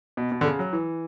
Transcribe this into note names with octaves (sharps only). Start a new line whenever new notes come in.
B2
B2
D3
C#3
F#3
E3